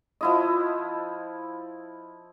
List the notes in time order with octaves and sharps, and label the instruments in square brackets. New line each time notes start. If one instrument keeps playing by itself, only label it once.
[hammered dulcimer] F3 E4 D#5